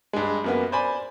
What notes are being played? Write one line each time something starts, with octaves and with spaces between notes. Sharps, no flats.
G2 G#3
F#2 A#3 B3
C5 D5 G#5 B5